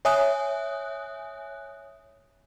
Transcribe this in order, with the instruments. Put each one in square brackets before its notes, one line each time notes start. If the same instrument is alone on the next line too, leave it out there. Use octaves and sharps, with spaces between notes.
[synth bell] C#5 E5 G#5 D#6 F#6